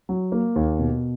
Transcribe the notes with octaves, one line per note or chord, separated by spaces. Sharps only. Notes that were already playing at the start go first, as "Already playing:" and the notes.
F#3
A#3
D#2
B2